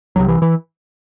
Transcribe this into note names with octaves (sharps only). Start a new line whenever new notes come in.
C2 C3 F#3
E3
E3